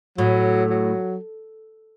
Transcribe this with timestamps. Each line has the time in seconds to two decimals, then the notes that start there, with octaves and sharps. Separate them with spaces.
0.18 A2 F#3
0.70 F#3